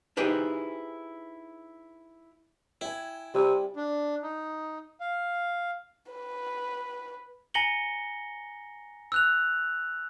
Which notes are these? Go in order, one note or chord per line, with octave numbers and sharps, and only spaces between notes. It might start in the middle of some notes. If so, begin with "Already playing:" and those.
D#4 E4 G4 G#4 B4 C5
E4 G5 G#5
C3 G3
D4
D#4
F5
B4
G#5 A#5 A#6 C#7 F#7 G7
E6 F#6 F7